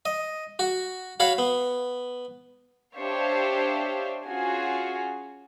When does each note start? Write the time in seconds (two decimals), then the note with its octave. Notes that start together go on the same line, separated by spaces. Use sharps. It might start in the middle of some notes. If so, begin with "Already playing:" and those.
0.05 D#5
0.59 F#4
1.20 F#4 C#5 F5 B5
1.38 B3
2.95 D4 G4 C5 C#5 E5 F5
4.26 C#4 F4 F#4 G#4 G#5